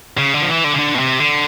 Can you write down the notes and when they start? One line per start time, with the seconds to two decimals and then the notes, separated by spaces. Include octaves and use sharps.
0.18 C#3
0.34 D3
0.42 F3
0.49 E3
0.64 D3
0.74 C#3
0.78 D3
0.95 B2
0.99 C3
1.20 D3